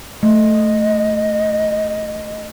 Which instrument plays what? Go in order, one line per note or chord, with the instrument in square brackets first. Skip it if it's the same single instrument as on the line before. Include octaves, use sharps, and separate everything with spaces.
[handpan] A3 [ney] D#5